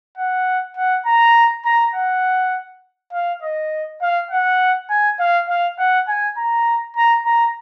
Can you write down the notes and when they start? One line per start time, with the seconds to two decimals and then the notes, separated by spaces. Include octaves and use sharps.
0.17 F#5
0.77 F#5
1.06 A#5
1.65 A#5
1.95 F#5
3.13 F5
3.42 D#5
4.01 F5
4.31 F#5
4.90 G#5
5.19 F5
5.48 F5
5.79 F#5
6.08 G#5
6.37 A#5
6.97 A#5
7.26 A#5